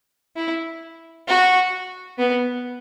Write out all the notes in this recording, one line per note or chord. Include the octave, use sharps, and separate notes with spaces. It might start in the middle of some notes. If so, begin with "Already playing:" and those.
E4
F#4
B3